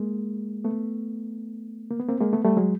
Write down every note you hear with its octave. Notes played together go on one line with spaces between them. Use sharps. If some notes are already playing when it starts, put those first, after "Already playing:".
Already playing: G#3 A#3
A3 B3
A#3
B3
A#3 C4
G#3 A#3
A3 B3
G3 A3
F#3 G#3